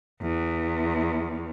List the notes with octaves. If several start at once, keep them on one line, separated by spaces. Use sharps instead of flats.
E2